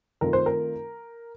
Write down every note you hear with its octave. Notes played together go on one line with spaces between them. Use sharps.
D#3 A3 C4 F4 A#4
C5
A#4